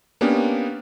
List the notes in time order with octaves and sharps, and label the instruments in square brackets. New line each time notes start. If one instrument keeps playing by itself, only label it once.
[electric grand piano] A#3 B3 C#4 D4 G4